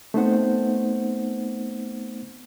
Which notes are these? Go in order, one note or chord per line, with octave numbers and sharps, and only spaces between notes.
A3 B3 C4 D#4 C5 F#5